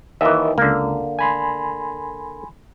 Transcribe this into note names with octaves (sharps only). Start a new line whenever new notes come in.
D#2 E3 A#4 D#5 E5
C#2 D3 A#3
G#5 B5 C6